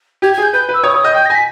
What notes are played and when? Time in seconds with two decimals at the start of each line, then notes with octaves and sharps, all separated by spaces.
0.22 G4 G#6
0.33 G#4 G#6
0.42 G6
0.53 B4 G6
0.69 B4
0.74 E6
0.83 C#5 D#6
0.94 C#5 D#6
1.04 D#5 G6
1.15 G5 G6
1.25 A#6
1.30 G#5
1.34 B6